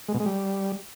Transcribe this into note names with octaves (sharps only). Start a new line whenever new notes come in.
G#3
B2
G#3
G3